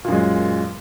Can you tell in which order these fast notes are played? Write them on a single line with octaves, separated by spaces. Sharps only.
A#2 F#2 G#3